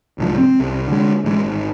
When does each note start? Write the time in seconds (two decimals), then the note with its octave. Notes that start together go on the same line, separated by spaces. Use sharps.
0.18 D1 C2 G#2 F3
0.38 C4
0.60 C2
0.88 D3 G#3
1.24 A1 E3 G#3
1.45 G#1